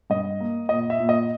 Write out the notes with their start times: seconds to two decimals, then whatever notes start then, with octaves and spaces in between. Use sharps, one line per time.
0.10 G2 D#5
0.40 A#3
0.69 A#2 D#5
0.90 E5
0.99 A#2
1.09 D#5